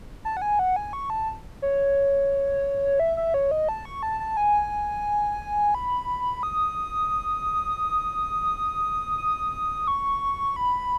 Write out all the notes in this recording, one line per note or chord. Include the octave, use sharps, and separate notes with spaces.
A5
F#5
G#5
F#5
G#5
C#6
A5
C#5
E5
E5
C#5
D#5
A5
C#6
A5
A5
G#5
B5
D#6
D#6
C#6
B5